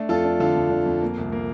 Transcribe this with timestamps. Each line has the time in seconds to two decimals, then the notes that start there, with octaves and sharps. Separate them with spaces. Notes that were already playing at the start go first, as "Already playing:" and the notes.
Already playing: A3 D4
0.09 F2 F4 A4
0.24 D4
0.40 D3 F4 A4
0.55 F2
0.70 D3
0.86 F2
1.01 A#3
1.17 C2
1.32 A#3